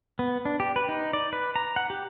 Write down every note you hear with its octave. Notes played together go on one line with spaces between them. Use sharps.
B3
D4
G4
B4
D#4
D5
B4
A#5
F#5
G4